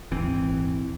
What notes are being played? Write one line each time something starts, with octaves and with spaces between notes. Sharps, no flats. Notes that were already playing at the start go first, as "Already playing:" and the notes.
D#1 G#1 E3 C4